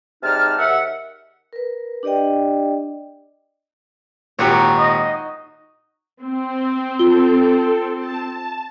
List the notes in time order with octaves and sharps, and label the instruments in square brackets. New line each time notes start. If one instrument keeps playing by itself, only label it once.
[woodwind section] G#2 C3 D#4 D5 A5 F6
D#2 E5 F#5
[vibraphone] A#4 B4
D4 G4 D5 D#5 G5
[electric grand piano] G#1 A#2 G4 [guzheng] D#4 F#4 C#5
[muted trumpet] D#5
[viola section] C4
[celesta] F4 G7 [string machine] A4
[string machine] A5